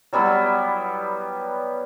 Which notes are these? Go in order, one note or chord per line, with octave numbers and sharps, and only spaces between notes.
F#3 G3 B3 E4